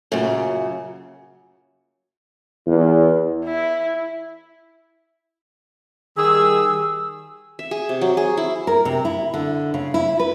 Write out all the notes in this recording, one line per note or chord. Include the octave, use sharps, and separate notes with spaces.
F#2 A#2 C#3
E2
E4
D#3 G3 G#4 E6
E5
G#4
C3
F#3
G#4
E4
A#4
C3
E4
D3
C#3
E4
B4